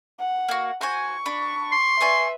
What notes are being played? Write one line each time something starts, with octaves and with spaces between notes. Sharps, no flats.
F#5
A#3 F#4
F#4 C5 G#5 C#6
D4 B5
C6
B4 D5 E5 G#5 C#6